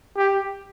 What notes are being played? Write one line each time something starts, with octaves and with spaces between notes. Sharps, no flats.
G4